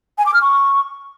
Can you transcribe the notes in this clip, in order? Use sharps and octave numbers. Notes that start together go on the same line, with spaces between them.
G#5
D6
F6
C#6